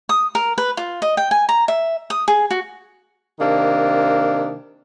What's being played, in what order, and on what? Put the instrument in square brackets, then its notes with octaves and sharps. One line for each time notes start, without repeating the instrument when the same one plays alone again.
[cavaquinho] D#6
A#4
B4
F4
D#5
G5
G#5
A#5
E5
D#6
G#4
F#4
[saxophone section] C3 D#3 A#3 D4